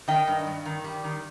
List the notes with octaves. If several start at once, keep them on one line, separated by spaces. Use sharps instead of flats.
D#3 D#5 G5
G2
G2
D#3
G3
D#3